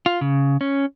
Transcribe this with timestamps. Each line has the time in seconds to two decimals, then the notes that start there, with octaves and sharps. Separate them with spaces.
0.06 F4
0.21 C#3
0.61 C#4